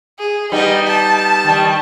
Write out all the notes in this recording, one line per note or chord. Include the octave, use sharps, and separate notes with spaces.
G#4
G3 B3 D#4 D#5
A5
D#3 G3